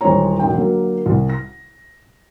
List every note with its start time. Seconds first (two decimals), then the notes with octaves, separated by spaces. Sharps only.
0.01 D#1 E3 G#3 C5 C#5 A#5
0.39 E1 G#2 G5
0.54 D3 F#3 A#3
1.06 C2
1.29 A#6